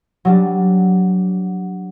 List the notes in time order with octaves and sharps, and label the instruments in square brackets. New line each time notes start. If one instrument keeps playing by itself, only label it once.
[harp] F#3 G3 D4